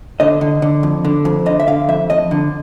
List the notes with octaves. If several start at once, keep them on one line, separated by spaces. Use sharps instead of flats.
D3 D#5
D3
D3
F2
D3
F2
D3 D#5
E5
D3 F5
F2 E5
F2 D#5
D3